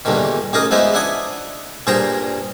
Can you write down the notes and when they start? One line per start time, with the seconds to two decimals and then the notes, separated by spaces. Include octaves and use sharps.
0.05 E2 G2 A#2 D3 D#3
0.53 A1 D#4 G#4 A#4 D#5
0.71 E2 F3 G#3 B3 D#4 E4
0.94 D4 E4 F#5 G#5 D#6
1.87 G2 A#2 G#4 C5 G5 A#5